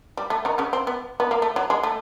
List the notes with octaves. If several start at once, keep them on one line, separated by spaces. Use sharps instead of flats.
G3
A3
D#3 D#4
C#3 C#4
C4
B3
B3
A#3
A3
F#3
G#3
A3